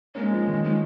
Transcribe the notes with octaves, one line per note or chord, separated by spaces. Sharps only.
G#3 A#3 C#4
F3
D#3
F3 G#3